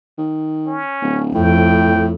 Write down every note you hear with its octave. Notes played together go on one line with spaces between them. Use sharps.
D#3
C#4
D1
F2 A2 G5